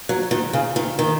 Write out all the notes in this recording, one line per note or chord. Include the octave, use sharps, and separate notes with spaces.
F#3
D#3
C#3
D#3
D#3